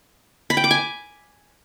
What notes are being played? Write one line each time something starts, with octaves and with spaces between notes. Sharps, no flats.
B5
G5
D6
G#5